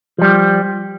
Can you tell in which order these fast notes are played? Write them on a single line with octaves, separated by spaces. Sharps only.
F3 G3 G4